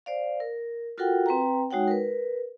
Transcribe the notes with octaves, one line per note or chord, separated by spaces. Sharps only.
C5 D5 F5
A#4
F4 F#4 A4 A#4 F#5 G5
C4 B4 G5 A#5
G#3 D#4 F#4 C#5 F#5 G5
A#4 B4